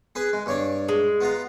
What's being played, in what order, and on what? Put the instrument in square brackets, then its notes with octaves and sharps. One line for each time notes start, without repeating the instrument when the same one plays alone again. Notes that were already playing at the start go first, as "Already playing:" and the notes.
[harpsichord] G#4 B4
G#3
G2 C#5 D5
[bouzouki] G#3
[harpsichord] B3 F4 A#5